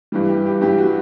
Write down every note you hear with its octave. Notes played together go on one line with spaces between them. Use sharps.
G2 E3 G3
G4
G4
G2 E3 G3 G4
F#4